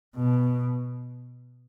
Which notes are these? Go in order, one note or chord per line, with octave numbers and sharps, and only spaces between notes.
B2